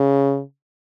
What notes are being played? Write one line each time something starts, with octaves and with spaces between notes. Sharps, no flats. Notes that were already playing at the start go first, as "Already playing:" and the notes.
Already playing: C#3